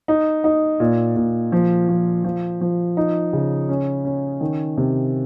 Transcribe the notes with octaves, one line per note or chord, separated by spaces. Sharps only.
D#4
D#4
A#2
A#2
F3
F3
F3
F3
D#4
C#3
C#4
C#4
D#3
C3